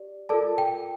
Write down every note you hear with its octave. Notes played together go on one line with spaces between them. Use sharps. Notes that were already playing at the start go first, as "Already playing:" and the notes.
Already playing: G4 D5
F4 A4 A#4 D5 A5
G5